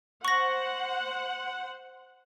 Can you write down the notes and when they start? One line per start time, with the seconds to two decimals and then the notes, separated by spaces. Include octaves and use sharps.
0.25 C5 F#5 C#6 A#6